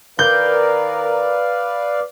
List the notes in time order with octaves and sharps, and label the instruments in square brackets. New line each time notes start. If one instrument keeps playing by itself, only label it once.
[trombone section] D#3 A#4 [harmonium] B4 D5 F5 [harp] G6